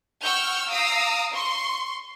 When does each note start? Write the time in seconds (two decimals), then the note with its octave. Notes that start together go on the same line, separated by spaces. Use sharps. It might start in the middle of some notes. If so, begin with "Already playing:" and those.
0.23 F#5 G5 C#6 E6 F6 G6
0.70 F5 A#5 D#6 E6 C7 D7
1.33 C6 C#6